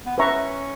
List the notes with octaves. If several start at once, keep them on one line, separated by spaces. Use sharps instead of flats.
B3
C#4 B4 E5 A#5 C#6